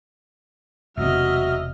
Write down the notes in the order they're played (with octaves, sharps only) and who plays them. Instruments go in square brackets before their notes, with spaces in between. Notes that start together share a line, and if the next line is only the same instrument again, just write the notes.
[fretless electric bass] E1 C3 [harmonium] F#3 E5 [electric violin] D#5 F6